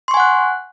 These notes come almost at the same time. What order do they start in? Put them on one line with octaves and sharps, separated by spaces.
C6 C#6 G#5 F#5 F#6